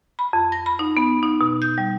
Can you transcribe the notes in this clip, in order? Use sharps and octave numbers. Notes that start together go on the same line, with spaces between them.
B5
F2
A#6
B5
D#4
B3
D#4
B2
G6
G3